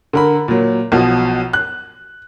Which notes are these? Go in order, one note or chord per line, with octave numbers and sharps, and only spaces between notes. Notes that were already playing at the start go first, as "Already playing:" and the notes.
D3 A#4 B5
A#2 F#3
B1 B2 F3
F#6